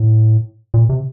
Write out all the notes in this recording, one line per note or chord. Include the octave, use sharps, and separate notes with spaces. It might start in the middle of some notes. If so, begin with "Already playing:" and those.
Already playing: A2
A#2
C3